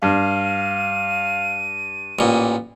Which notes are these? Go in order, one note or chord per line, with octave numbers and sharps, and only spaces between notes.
G2 F5 D#7
A1 A#2